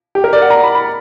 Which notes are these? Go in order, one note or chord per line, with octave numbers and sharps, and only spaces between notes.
G4
A#4
D5
F#5
A#5
B5
B5